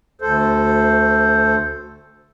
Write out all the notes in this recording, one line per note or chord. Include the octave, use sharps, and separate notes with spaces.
D2 A4 C5